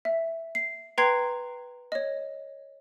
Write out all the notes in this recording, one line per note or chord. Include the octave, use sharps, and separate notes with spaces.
E5
C7
B4 G5 A#5 C6 G#6 C7
C#5 D#5